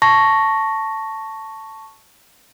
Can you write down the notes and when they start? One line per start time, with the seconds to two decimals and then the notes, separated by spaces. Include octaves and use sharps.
0.02 A5 C#6 A#6